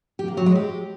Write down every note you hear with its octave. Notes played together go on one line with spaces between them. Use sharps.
G4
A#3
F#3
G#3
G4